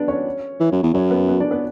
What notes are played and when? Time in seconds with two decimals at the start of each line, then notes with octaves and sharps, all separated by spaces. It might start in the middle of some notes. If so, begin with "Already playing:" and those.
Already playing: B3 D4 D5
0.08 C#4 C#5
0.60 E3
0.72 F#2
0.83 E2
0.94 F#2 C#4 C#5
1.11 B3 B4
1.29 B3 B4
1.40 D4 D5
1.51 B3 B4